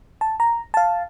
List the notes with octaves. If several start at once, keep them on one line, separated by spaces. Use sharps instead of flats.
A5
A#5
F5 A5